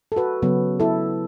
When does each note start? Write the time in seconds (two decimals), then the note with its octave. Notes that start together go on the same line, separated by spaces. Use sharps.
0.12 A4
0.16 F#4 B4
0.42 C#3 F#3 B3
0.80 E4 A4